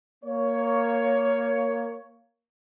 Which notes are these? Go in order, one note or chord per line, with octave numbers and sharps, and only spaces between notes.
A#3 C#5